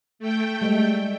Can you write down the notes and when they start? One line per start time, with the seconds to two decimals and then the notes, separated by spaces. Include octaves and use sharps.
0.19 A3 G5
0.61 G3 G#3